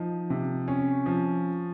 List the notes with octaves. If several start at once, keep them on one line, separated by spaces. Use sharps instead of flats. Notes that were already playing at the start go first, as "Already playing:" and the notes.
Already playing: F3 D#4
C3
C#4
F3